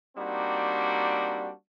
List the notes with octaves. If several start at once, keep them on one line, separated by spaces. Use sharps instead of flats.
G3 A#3 C4 D4 D#4 F#4